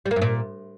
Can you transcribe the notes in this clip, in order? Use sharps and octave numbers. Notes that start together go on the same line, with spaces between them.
G3
A#3
G2
A#2